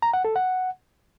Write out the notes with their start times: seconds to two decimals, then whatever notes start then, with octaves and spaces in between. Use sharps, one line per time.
0.02 A#5
0.13 F#5
0.25 A4
0.36 F#5